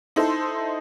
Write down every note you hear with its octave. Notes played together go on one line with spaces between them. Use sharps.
D#4 E4 A4 C5